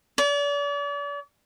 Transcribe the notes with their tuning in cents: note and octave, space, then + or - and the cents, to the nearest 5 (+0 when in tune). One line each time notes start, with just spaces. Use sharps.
D5 -40